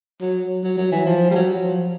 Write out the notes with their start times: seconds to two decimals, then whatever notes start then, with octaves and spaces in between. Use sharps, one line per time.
0.22 F#3
0.64 F#3
0.78 F#3
0.92 E3
1.06 F3
1.31 G3
1.35 F#3
1.63 F3